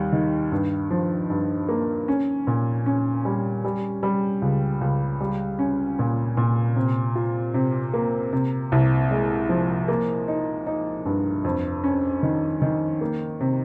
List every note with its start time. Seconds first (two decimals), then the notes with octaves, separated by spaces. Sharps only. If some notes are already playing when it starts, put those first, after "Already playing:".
Already playing: D#2 G3
0.13 D#3
0.52 G2
0.91 F3
1.30 G2
1.69 A#3
2.08 C#4
2.47 A#2
2.86 C#4
3.25 G3
3.65 G3
4.03 G3
4.42 C#2
4.81 C#2
5.21 G3
5.59 C#4
5.99 A#2
6.37 A#2
6.76 C3
7.15 F4
7.54 C3
7.94 A#3
8.33 C3
8.72 C2
9.11 G#3
9.49 F3
9.88 A#3
10.28 D#4
10.67 D#4
11.06 G2
11.44 F2
11.84 C#4
12.23 D#3
12.62 D#3
13.01 A#3
13.40 C3